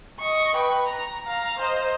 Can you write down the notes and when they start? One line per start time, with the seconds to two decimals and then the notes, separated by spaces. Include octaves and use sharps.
0.20 D#5 C#6
0.55 B4 G5
0.86 A#5
1.26 F5 A#5
1.58 C5 D#5